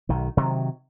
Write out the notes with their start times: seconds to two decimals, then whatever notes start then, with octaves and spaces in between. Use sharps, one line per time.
0.09 B1 D#3
0.37 C3 D#3 F#3